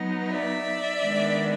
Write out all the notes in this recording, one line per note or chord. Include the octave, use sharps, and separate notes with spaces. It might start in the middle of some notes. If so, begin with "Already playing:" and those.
Already playing: F#3 B3 D#4
D5 E5
D#3 G#3 B3 D4